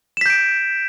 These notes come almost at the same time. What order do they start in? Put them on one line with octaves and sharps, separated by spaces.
E7 B6 G6 D7